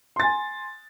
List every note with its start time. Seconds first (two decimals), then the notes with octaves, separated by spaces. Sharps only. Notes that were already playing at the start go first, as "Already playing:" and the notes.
0.16 C6
0.20 A6
0.23 G#5